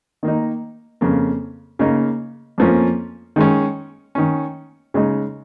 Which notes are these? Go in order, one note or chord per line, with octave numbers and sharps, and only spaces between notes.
D#3 A#3 D#4
F2 C#3 A#3
C#3 A#3 D#4
F2 F3 A#3 C#4
D#3 G#3 C#4
D#3 C#4
C#3 G#3 D#4